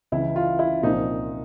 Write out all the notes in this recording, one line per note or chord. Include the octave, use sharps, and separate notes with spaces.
C#2 C#3 E3 E4
F4
E4
C2 A#2 F3 D#4